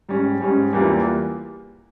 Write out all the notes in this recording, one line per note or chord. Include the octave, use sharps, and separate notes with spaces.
G#2 G3 C#4
G#2 G3 C#4
E2 E3 G3 A#3 F4